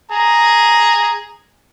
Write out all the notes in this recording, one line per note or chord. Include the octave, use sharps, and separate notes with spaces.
G#4 A#5